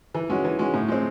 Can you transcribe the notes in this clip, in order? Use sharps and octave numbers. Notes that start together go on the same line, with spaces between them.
E3
G#3 C#4 F#4
E3
G#3 C#4 F#4
A2
G#3 C4